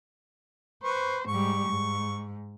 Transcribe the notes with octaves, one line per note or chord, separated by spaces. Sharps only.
B4 C5 C#6
G#2 G3 C#6
G#2